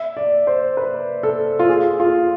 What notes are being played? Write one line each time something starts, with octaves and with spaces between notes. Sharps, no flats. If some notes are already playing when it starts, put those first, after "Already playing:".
Already playing: E5
D5
C5
B4
A4
F4
G#4
F4